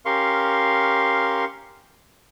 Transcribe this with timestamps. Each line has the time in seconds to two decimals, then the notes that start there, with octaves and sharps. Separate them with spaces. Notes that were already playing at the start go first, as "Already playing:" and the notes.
0.06 C#4 G4 A#4 F5 C6 C#6